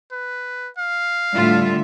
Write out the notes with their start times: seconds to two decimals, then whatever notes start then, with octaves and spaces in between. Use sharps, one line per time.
0.12 B4
0.78 F5
1.34 A2 D3 G3 F4 E5